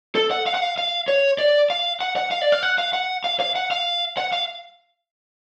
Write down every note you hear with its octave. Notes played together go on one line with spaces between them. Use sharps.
A4
F#5
F5
F#5
F5
F5
C#5
D5
F5
F#5
F#5
F5
D5
F5
F#5
F5
F#5
F5
F5
F#5
F5
F#5
F5